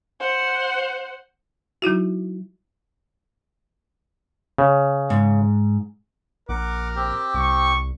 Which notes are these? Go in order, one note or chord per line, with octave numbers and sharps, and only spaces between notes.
C5 F#5
F#3 D#4 E4 F#4
C#3
G#2
A#1 A#4 F#5 D6
C4 G4
C2 C#6